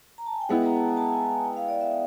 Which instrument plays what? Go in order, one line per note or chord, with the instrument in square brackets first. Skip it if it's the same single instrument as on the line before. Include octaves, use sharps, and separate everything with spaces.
[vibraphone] A#5
A5
G#5
G5
[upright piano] G#3 B3 E4 [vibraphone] F#5
[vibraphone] A#5
A5
A#5
A5
A5
G#5
G#5
G5
F5
D5
E5